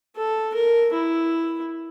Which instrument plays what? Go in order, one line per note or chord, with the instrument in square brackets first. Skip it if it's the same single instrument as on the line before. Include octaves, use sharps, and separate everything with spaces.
[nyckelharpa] A4
A#4
E4